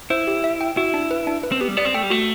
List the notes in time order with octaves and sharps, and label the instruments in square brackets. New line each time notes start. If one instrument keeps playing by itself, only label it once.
[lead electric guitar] E4 [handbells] C5
[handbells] G4
E5
G5
[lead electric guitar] E4 [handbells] F#4
[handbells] D4
B4
D4
B4
[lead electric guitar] C4
[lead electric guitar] B3 [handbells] G4
[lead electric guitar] G3
[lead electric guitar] B3 [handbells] D5
[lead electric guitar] C4
[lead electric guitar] A3 [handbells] G5
[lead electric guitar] G3
[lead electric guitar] A3 [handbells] F#4